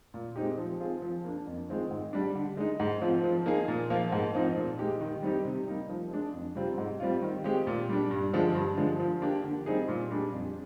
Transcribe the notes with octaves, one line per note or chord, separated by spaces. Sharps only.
A#2
G#3 C4 D#4 G4
F3
C4 F4 G#4
F3
A#3 D4
F2
D#3 G#3 C4 F4
G#2
G3 D4
D3
G#3 D#4
G#2
F3 C4 F4
F3
A#3 D#4 G#4
A#2
F3 A#3 F4
G#2
F3 C4 D#4
A#2
G#3 D#4 G4
D#3
G3 C4 D#4 G4
C3
G3 A#3 D#4
F3
G#3 D4
F2
C3 G3 C4 F4
G#2
G3 C4 F4
D#3
G#3 C4 G4
A#2
G3 D4
G2
D3 F3 G#3 D4
G2
D3 F3 G#3
F3
A#3 D4 G4
D3
G3 C4 D#4 G#4
A#2
G3 D4 G#4
F2